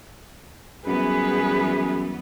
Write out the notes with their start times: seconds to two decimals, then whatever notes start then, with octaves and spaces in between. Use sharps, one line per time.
0.87 F#2 E3 G3 B3 G#4 B4